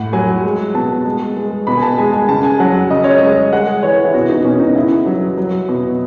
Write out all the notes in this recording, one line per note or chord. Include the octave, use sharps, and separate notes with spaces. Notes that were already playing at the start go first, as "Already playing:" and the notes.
Already playing: A2 F#5
F#3 G#5
G#3
B2 A5
G#3
G#3
B2 B5
G#5
A5
G#3 G#5
G#5
C#3 A5
G#5
F#3 F#5
C#3 D#5
C#5
G#3 D#5
G#3 F#5
E3 C#5
E4
B2 F#4
D#4
B2 C#4
D#4
C#3 E4
F#3
F#3
B2